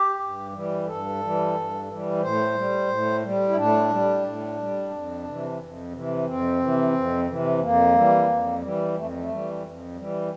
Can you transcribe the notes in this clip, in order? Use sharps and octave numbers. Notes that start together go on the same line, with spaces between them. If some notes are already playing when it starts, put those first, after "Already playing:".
Already playing: G4
G2
E3 G3
G2 A4
E3 G3
G2
E3 G3
A2 C5
G3
A2
G3
E4
A2 D4
G3
A2
G3
F2
C3 E3
F2
C3 E3
F2 C4
C3 E3
F2
C3 E3
F2 A#3
E3 G3
F2
E3 G3
F2 A3
A3
E3 G3
F2
E3 G3